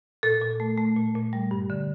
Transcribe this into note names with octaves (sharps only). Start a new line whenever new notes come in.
A#2 A4
A#2
A3
A3
A#2
A#2
G3
G2
D3